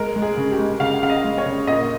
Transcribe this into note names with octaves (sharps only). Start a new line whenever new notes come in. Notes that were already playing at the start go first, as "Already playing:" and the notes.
Already playing: G#3 A#4
G#3
G#4
C#3
G4
G#3
C#3 F5
C#3 F5
D#5
G#3
C#5
C#3
A#2 D#5